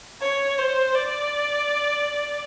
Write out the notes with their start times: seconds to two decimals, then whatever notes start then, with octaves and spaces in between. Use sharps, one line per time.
0.22 C#5
0.58 C5
0.95 D5